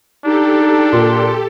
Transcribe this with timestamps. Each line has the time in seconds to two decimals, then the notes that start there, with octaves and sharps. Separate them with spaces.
0.25 D4 D#4 G4 A4
0.93 A#2 C6